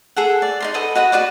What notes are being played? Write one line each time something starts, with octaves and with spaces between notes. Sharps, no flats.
G#4 A4 F#5
D5
D#4 A#4 C6
A4 B4 D#5 F#5
F#4 D#5 F#5 B5
F#4 B4 D5 D6